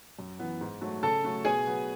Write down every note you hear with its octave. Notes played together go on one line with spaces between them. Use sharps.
F#2
E3 B3
G#2
F#3 A3
C#3 A4 A5
F#3 A3
B2 G#4 G#5
F#3 B3